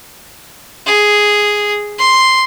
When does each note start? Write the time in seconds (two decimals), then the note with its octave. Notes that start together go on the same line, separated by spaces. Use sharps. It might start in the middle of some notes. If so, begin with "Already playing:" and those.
0.86 G#4
1.99 C6